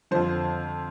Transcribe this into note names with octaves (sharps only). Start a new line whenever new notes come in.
F2 D3 F3 C5